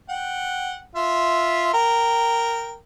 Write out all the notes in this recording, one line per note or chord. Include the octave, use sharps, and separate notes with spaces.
F#5 G5
F4 E5
A#4 G5